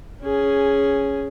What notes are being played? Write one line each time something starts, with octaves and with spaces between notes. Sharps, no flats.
C#4 G#4